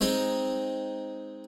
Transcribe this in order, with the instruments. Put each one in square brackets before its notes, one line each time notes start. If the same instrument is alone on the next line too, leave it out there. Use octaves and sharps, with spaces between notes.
[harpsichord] G#3 C4 D#4